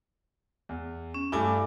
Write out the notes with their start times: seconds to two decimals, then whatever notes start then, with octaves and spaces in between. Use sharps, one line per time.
0.69 E2
1.14 C#4
1.32 G2 A3 E4 G#5 D6